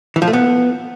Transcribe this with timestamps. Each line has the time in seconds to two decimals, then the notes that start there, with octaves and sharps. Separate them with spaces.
0.16 E3
0.22 F3
0.28 A3
0.33 B3